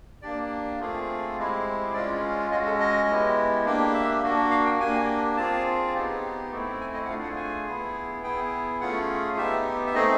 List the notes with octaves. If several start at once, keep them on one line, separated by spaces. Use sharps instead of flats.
A#3 D4 G4 D5
A3 C4 F4 G#4
G#3 C4 E4 G4
G#3 C#4 F4 D5
G#3 C#4 F#4 D#5
A4
D#5
G#3 B3 E4 G4
A#3 D4 G4
E5
A#3 D4 F#4
F5
G5
A#3 D4 G4 G#5
C4 F4 G#4 A5
B3 D#4 G4
A3 C4 E4
G#5
D#5
F#5
A3 D4 F4 G#4 F5
F#5
G#5
B3 E4 G#4
B3 E4 G#4 G5
A3 C#4 F4 G#4 F#5
B3 D#4 G4 E5
E5
A3 C4 D#4 G#4 D#5